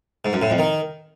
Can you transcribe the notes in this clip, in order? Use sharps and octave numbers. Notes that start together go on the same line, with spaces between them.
G#2
F#2
A2
F2
D#3